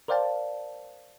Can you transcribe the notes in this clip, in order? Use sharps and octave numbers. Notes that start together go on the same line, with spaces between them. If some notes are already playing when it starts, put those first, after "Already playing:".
A#4 C5 D5 F5 G5 A5